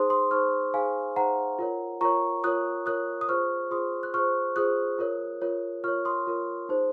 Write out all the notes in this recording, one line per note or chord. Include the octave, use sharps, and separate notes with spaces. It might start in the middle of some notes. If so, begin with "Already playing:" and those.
Already playing: D#4 G#4 C5 C6 D#6
C6 D#6
D#4 G#4 C5 C#6 F6
D#4 G#4 C5 F5 G#5
D#4 G#4 C5 F#5 A#5
F4 A#4 C#5
F4 A#4 C#5 A#5 C#6
F4 A#4 C#5 D#6 F#6
F4 A#4 C#5 D#6 F#6
D#6
F4 G#4 C5 C#6 F6
F4 G#4 C5 C6 D#6
F#6
F4 G#4 C5 C#6 F6
F4 G#4 C5 D#6 F#6
F4 A#4 C#5
F4 A#4 C#5
F4 A#4 C#5 C#6 F6
C6 D#6
F4 A#4 C#5
D#4 G#4 C5